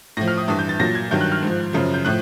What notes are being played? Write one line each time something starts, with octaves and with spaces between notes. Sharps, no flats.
A2 F3 A#6
F6
D#6
G2 E3 D#6
G6
A6
A#2 F#3 A#6
G#6
G2 D#3 F#3 G6
F#6
F6
G#2 F3
F#2 C#3 F3
G6
A2 F3 F#6